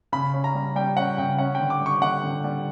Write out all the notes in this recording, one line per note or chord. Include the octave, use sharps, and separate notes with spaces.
C#3 B5
C#4
A#5
G3
G3 G5
C#4 F#5
C#3 G5
C#4 F#5
G5
D3
D6
G3
C#6
D3 F#5
D3
G3